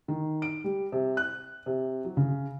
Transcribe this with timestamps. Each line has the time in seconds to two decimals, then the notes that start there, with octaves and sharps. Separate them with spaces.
0.08 D#3
0.42 D7
0.64 G3
0.92 C3
1.17 F#6
1.66 C3
2.04 F#3
2.17 C#3